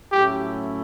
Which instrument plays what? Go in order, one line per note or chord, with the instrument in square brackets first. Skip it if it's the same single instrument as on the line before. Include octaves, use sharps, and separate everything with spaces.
[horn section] A2 F#3 A3 C#4 E4 [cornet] G4